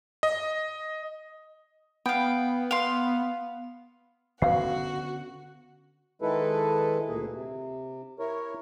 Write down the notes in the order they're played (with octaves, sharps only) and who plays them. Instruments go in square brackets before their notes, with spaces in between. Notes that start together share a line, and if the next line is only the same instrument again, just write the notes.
[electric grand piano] D#5
[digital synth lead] B3 [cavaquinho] F5 G5
[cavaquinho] F5 C6
[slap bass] D3 B3 C#4 [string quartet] F#4 [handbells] B4 F5 C7
[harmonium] D#3 G#3 E4 A4 B4
D2 A#2 A#3 G#4
C3
E4 A#4 C#5